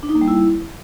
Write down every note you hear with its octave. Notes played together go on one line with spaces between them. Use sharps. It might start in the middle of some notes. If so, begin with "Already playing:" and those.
D4
D#4
A#3
G3
E4